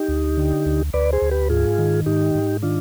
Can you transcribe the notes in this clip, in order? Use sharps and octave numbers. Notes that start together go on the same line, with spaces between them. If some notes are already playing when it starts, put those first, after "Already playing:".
Already playing: D#4 G4
D2
D3
D2
D2 B4 D5
G#4 C5
D2
G4 B4
G#2 F4 G#4
D#3
G#2 D#4 G4
G#2
D#3 D4 F4